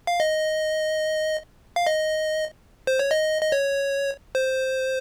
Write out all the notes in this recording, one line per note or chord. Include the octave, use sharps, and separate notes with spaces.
F5
D#5
F5
D#5
C5
C#5
D#5
D#5
C#5
C5